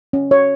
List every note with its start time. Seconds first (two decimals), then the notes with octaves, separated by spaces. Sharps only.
0.13 C#4
0.31 C#5